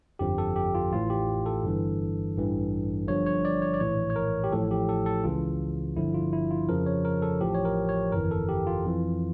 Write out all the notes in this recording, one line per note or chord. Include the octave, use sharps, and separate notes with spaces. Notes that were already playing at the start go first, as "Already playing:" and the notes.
G1 F2 D3 F3 G4
A4
G4
F4
A1 A2 E3 F4
G4
A4
G1 G2 E3
A1 G2 E3
G1 G2 D3 F3 C#5
C#5
D5
C#5
D5
A#1 A2 E3 C#5
C#5
A#4
G4
A1 A2 F3 A4
G4
A4
A4
C#2 C#3 E3 F4
G1 G2 D3 F3 E4
F4
E4
F4
F2 C#3 F3 A#4
C#5
A#4
A4
A1 A2 F3 G4
C#5
A#4
C#5
G1 F2 E3 A#4
A4
G4
F4
F2 E3